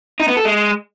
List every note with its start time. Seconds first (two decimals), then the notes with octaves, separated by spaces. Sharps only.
0.20 D#4
0.28 B3
0.37 A4
0.45 G#3